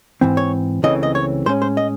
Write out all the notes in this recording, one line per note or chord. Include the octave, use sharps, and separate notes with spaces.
G#2 E3 C4
C#5
C#2 C#3 E3 A3 C4 D#5
D#5
C#5
A2 G#3 C#4 C5
C5
D#5